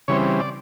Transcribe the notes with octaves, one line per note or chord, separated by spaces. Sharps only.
C#3 E3 G3 C4 C#5
D5